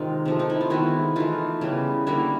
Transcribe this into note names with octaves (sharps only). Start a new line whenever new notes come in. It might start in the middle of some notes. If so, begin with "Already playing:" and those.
Already playing: C3 D#3 G#3 D#4 F4
C3 F3 A3
D#4
E4
F4
D#3 G#3 B3 E4 F#4
E3 A3 D#4 F4
C#3 E3 G3 B3
D3 G3 A#3 E4 F#4